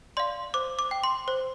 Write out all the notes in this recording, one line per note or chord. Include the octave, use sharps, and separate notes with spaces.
D5 F5 C6
C5 D6
D6
G5
C6
C5